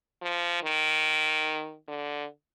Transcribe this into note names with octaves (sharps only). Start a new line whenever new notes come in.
F3
D#3
D3